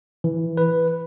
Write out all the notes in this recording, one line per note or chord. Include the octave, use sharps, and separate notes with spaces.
E3
B4